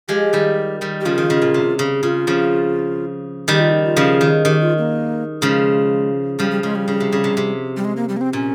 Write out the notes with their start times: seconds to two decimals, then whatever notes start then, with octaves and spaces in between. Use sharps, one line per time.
0.08 F3 G#3 G4
0.33 D#3 G3
0.81 D#3 G3
1.01 G4
1.05 C#3 F3 F4
1.18 D#3
1.30 C#3
1.42 A#2
1.54 C3
1.79 C#3
2.03 C#3 F4
2.27 C#3 F3
3.48 D#3 G3 G4
3.60 F4
3.72 D#4
3.85 F4
3.97 C#3 F3
4.21 D#3
4.45 D#3 G4
4.62 F4
4.78 A#3
5.42 C#3 F3 G#3
6.39 C#3 F3 G3
6.51 G3
6.63 C#3 G#3
6.75 G3
6.88 C#3
7.00 C3
7.13 C#3
7.24 C3
7.37 C3
7.77 G3
7.85 G#3
7.97 A#3
8.09 G3
8.17 A#3
8.21 C4
8.33 A#2 C#4